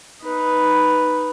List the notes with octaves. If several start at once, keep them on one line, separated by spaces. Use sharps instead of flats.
D#4 B4